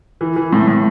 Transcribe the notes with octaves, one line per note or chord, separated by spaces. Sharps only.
E3
E3
A2
A2